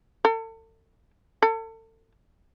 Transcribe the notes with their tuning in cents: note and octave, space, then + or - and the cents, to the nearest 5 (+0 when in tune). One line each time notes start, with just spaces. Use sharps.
A4 +35
A4 +35